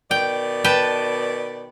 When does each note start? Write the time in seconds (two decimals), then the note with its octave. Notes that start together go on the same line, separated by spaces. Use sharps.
0.11 B2 D#3 D5 G5
0.64 B4 G5 A5